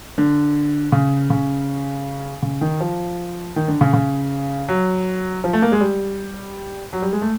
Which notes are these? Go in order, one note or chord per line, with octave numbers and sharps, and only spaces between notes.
D3
C#3
C#3
C#3
D#3
F3
D#3
D3
C#3
C#3
F#3
F3
A3
A#3
G#3
G3
F#3
G3
G#3
A3